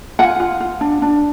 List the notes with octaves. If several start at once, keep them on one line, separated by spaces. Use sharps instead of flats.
F4 F#5 G#5
F4
F4
D4
D4